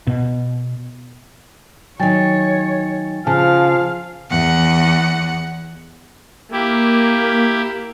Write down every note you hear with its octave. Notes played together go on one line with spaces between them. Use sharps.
B2
D#3 F#3 C#5 G5 G#5 A6
C#3 F3 F5 G#5 A5 F6
E2 F#5
A#3 E4 G4